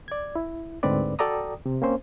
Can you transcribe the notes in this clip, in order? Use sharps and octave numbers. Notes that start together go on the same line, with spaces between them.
D5 G#6
E4
D2 G#2 D3 C4 B4 D5
F#4 A4 D5 G5 A#5 D#6
C3
A#3 C4 C#4 C5